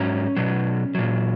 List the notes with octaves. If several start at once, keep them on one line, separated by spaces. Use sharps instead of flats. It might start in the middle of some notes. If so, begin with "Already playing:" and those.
Already playing: G#2 F#3 C#4
B2 F#3
A#2 F#3